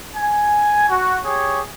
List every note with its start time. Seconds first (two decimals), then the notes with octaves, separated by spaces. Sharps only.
0.15 G#5
0.89 F#4
1.24 G4 G#4 C#5